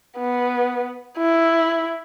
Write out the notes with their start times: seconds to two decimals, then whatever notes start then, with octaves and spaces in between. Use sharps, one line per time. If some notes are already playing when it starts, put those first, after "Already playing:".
0.18 B3
1.18 E4